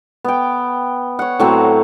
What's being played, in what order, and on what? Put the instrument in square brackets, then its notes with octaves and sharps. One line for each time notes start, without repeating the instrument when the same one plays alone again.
[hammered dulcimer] B3 G5
C#5 F#5
A2 F#3 C4